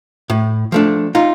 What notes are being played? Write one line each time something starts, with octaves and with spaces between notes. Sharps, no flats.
A2
F3 A3 D4
D#4 F4